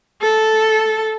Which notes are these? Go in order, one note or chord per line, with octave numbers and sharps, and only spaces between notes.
A4